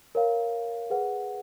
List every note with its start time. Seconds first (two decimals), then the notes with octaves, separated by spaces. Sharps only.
0.15 A#4 C#5 F5
0.90 G#4 B4 F#5